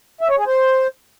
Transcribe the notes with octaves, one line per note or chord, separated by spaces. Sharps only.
E5
C#5
G#4
C5